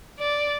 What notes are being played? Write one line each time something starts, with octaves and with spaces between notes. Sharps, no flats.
D5